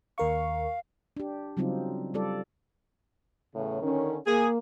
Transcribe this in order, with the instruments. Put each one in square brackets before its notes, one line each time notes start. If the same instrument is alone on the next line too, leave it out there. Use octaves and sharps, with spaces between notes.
[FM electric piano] D#2 A#4 C#6 [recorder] F5
[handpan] D4 G4
C#3 F#3 G3 C4 D#4 F4
G3 F4 A4 D5
[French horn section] E2 A2 C#3
D3 D#3 C#4
[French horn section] A#3 [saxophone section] G#4